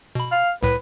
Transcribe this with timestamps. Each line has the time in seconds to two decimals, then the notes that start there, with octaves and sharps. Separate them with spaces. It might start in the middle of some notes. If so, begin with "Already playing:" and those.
0.15 B2 B5
0.32 F5
0.63 C2 A2 B4